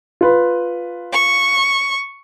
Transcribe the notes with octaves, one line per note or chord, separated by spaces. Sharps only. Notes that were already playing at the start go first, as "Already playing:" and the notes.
F4 B4
C#6